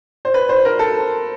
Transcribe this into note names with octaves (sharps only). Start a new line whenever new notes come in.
C5
B4
C5
A#4
A4